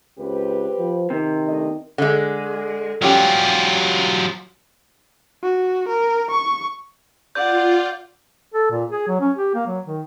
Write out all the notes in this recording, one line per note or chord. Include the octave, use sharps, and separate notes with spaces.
C#2 C4 G4 B4
F3
C3 D#3
A3 D4 D#5
D3 G#3
F#3 G3 C#4 F4 G4
F#4
A#4
C#6
F4 D5 F#5 G6
A4
A#2
G#4
F#3
C#4
G4
A#3
F#3
D#3